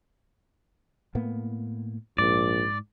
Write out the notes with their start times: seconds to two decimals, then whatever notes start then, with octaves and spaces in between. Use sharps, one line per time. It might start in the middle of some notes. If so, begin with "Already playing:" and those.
1.15 A2 A#3 B3
2.18 A#1 G#2 D5